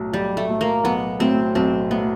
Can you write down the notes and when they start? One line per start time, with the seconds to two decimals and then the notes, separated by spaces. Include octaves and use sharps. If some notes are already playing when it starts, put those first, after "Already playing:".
Already playing: B1 A2 F#3
0.13 B1 G3
0.37 A3
0.48 A2 F#3
0.61 A#3
0.84 B1 B3
1.20 A2 F#3 C4
1.55 B1 C4
1.90 A2 F#3 B3